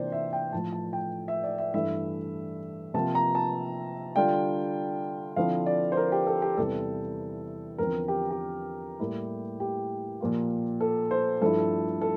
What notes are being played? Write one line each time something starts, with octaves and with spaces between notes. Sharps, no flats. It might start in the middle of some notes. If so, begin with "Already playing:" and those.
Already playing: C3 E3 A#3 D4 F4 C5 D5
E5
G5
A2 F3 A3 A5
A5
G5
E5
D5
E5
G2 E3 A3 E4 E5
C3 F3 A#3 F4 A5
A#5
A5
D3 G3 D4 F4 G5
D3 F3 C4 E4 F5
D5
C5
A#4
G4
A4
G4
E2 C3 E3 G3 A4
E2 D3 F3 C4 A#4
G4
G4
A2 G3 A#3 E4
G4
A#2 F3 A#3 F4
A4
C5
G2 F3 A3 E4 A4
A4